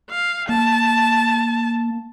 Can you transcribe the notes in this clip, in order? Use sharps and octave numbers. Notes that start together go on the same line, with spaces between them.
F5
A#3 A5